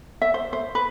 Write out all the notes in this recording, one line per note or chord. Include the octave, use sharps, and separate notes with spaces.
E5
C5
C5
B4